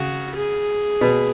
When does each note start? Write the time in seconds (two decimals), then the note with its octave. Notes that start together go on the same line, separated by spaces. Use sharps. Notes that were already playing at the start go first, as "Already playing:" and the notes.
Already playing: C#3 F#4
0.35 G#4
1.01 B2 B3